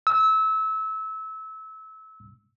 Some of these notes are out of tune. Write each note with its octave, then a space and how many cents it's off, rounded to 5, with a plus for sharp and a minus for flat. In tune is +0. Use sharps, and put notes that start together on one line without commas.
E6 -25